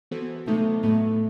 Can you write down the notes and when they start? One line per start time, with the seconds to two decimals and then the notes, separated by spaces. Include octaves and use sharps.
0.11 E3 B3 F#4 A4 C5
0.47 C3 F#3 A3 B3 D#4
0.83 A2 F#3 A3 B3 D#4